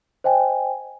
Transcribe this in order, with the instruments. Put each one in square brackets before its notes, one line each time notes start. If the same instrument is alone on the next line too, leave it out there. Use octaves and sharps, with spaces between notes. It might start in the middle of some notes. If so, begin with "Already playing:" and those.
[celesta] C5 D#5 G5 G#5